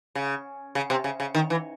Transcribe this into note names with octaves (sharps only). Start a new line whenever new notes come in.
C#3
C#3
C3
C#3
C#3
D#3
E3